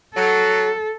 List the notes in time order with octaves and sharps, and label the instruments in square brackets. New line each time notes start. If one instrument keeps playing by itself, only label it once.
[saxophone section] F#3 [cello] A4